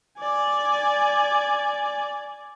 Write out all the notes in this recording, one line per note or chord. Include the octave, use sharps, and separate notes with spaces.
D5 G#5